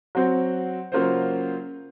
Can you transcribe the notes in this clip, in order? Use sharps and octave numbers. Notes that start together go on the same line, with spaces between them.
F#3 C4 F#4 C5
C#3 F#3 A#3 F4 C5